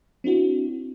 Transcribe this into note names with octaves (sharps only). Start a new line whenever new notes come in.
C4 D4 E4 F#4